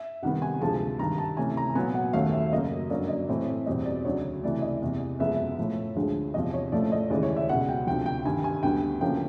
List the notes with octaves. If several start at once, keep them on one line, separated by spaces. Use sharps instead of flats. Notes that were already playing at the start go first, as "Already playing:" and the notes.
Already playing: E5
C3 D#3 G3 B3 F#5
G#5
D2 C3 F3 G#3 A5
G2 D#3 G3 A#5
A5
C3 E3 A3 C#4 G#5
A#5
A#2 F#3 B3 G#5
F#5
D#2 D#3 F#3 A3 C#4 F5
E5
F#2 C#3 F#3 A#3 C#4 D#5
G2 D3 F#3 A#3 C#4 D5
D#5
A2 E3 A3 C4
E2 B2 G3 C4 D#5
D5
D2 C#3 F#3 C#5
C#2 C3 E3 A3 D5
D#5
E2 C3 E3
F#2 C#3 F3 G#3 B3 E5
A2 F3 A3
D2 D3 F3 G#3
E2 C3 F3 D#5
C#5
A2 F3 A3 C#4 D5
D#5
D#2 C#3 E3 G#3 D5
C#5
E5
C#2 B2 G#3 C#4 F#5
G5
D2 C3 F3 G5
G5
G2 D#3 G3 G#5
G#5
D2 D3 G3 B3 G5
D2 C#3 F3 A#3 C#4 G5